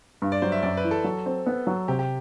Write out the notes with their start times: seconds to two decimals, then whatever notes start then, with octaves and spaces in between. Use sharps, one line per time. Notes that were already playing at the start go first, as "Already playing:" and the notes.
0.22 G2
0.32 D5
0.42 F#3 C5
0.52 E5
0.63 F#2 D5
0.77 B4
0.84 E3
0.91 A4
1.04 F#3
1.26 C4
1.47 B3
1.67 F#3
1.88 C3 G4
1.99 G4